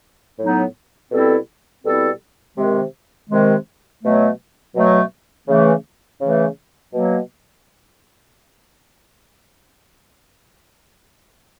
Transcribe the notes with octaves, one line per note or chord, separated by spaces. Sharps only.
A2 F#3 B3 D#4
B2 G3 C4 E4 A4
B2 G3 C4 E4 A4
C3 D#3 G#3
C3 D#3 G#3
B2 F#3 A3
B2 F#3 A3
C#3 E3 A3
C#3 E3 A3
B2 F#3 A#3